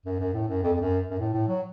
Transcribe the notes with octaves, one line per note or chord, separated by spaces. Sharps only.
F#2
F#2
A2
F#2
F2
F2
F#2
F#2
A2
A2
F#3